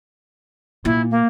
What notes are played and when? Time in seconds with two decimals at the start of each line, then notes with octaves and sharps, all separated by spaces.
0.85 A#2 E4
1.10 A#3